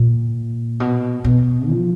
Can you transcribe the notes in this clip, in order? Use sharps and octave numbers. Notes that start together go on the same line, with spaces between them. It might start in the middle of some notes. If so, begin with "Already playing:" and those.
Already playing: A#2
B2
B2
F3